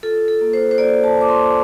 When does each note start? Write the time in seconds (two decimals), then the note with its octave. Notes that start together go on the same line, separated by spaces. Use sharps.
0.03 F4 A4
0.28 A4
0.41 A#3
0.53 C5
0.71 C5
0.78 A#3 D5
1.04 A5
1.16 F4
1.21 D6
1.29 C6